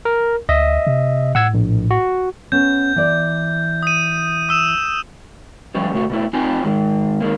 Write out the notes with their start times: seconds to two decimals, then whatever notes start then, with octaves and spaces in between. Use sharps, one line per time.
0.05 A#4
0.49 D2 D#5 E5
0.87 C3
1.35 A2 F#5 E6 G#6
1.54 A#1
1.91 F#4
2.52 B3 C#4 G6
2.96 E3 D5
3.83 D#6 D#7
4.49 D#6 E6 E7
5.75 F3 G3 A3 C#4 G4
5.93 A2 C3 A3 F#4
6.10 B2 A3 E4
6.33 C4 D#4 F4 G4 C5 G#5
6.64 G#2 D#3 G#3
7.20 D#3 G#3 A#3